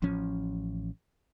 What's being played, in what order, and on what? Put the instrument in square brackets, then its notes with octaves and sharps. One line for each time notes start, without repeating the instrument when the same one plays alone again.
[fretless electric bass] A1 F3 C#4